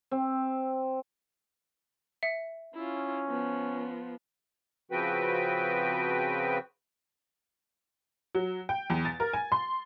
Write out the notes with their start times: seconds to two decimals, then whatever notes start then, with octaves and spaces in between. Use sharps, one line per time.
0.11 C4
2.23 E5 C#7
2.74 C#4 E4 F4
3.29 F3 B3
4.91 C#3 F3 C4 F#4 B4 G5
8.35 F#3
8.69 G5
8.90 E2
9.05 A6
9.20 A#4
9.33 G#5
9.52 C6